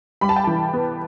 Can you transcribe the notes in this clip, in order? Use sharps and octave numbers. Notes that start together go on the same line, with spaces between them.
G3 B5
A5
G5
E3 A5
B3